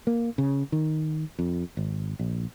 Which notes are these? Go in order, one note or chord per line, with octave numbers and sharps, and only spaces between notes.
A#3
C#3
D#3
F2
G#1
A#1